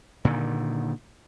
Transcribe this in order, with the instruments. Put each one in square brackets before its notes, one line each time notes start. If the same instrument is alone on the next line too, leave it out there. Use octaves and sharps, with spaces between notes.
[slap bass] A#2 D3 D#3